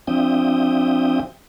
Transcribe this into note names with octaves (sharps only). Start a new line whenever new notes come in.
F3 C4 D4 E5 G5 D#6